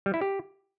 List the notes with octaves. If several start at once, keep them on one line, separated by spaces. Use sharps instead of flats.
G3
E4
G4